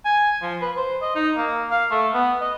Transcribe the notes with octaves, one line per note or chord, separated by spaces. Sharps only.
G#5
F3
B4
C5
D#5
D#4
A#3
F5
A3
B3
D#5